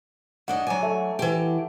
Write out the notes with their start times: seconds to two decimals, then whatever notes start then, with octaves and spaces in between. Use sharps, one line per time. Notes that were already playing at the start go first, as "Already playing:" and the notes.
0.48 F#2 D4 D#5 F#5
0.67 F#3 D5 G#5
0.83 A3
1.19 E3 G4